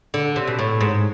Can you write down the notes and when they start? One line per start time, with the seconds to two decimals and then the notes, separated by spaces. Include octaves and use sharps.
0.14 D3
0.36 C3
0.47 B2
0.59 A2
0.80 G#2